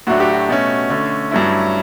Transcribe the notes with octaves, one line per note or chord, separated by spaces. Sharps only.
A2 F#3 A3 D4 F#4
G4
F#4
B2 A3 C#4
D3 A3 C#4
G2 F#3 A3 C#4 E4